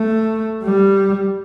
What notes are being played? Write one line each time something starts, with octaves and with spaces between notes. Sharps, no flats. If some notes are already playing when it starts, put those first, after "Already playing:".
Already playing: A3
G3